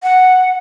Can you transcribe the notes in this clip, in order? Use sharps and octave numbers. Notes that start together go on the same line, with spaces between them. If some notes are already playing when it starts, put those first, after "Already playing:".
F#5